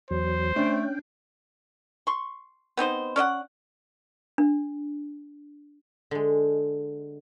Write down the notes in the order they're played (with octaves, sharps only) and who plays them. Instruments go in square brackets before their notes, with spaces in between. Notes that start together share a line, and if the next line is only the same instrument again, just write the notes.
[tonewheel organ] E2 F#3 [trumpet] C5
[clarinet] A3 [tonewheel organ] C#4 G5 [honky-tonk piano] D4
[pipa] C6 C#6
B3 C4 D#4 C5
C#4 D5 D#5 F#5
[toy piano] D4
[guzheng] D3 G#3